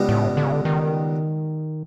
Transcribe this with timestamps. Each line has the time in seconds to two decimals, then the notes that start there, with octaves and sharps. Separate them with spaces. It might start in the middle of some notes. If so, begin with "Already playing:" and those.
Already playing: C#2 B2 G3 B3
0.09 A2
0.37 D3
0.45 C#3
0.52 D3
0.65 D#3